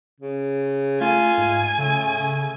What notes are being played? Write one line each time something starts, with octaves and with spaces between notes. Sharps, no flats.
C#3
A3 F4 G#5
G#2
C#3 A3